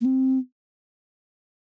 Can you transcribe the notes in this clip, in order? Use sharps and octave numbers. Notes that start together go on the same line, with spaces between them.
A#3
C4